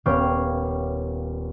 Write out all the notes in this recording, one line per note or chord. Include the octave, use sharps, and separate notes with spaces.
D#1 B3 C#5 F5 G5 D6